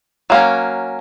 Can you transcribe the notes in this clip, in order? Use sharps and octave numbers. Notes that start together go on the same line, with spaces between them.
F#3 A#3 C#4